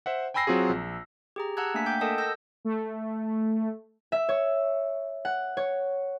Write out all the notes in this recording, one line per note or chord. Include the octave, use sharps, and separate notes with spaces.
C5 E5 F#5
G5 G#5 B5 E6 A#6 C7
F#3 C4 F4 F#4 G#4
A#1
G4 G#4 A#5
F#5 A5 A#5 E6 F#6 G#6
A3 A#3 D4 G#5 B6
G5 D6 G6
A4 A#4 D#5 F#5 A5 D#6
E6 G6 A#6
A3
E5
C#5
F#5
C#5